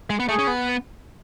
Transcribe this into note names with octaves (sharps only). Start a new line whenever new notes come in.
G#3
B3
A3 G#4
C#4
B3